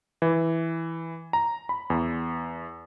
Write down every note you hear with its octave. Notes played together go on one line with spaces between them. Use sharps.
E3
A#5
B5
E2